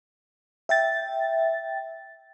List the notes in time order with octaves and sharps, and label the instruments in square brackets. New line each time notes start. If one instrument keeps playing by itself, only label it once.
[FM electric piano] E5 G5 A6